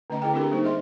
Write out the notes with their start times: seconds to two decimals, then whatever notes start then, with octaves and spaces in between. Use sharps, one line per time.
0.10 D3 A3 C#4 D#5 A#5
0.22 D3 E4 G#4 G5
0.34 C4 D4 E4 G4 A4 A#4
0.51 G3 A#3 D#4 C5
0.64 G#4 C5 D#5 E5 C6